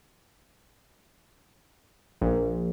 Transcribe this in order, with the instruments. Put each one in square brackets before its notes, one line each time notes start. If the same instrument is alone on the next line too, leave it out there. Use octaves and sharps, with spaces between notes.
[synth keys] A#1